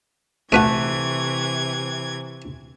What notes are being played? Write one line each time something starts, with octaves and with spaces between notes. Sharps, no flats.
C3 E3 A3 F#4 B4 D5 G#6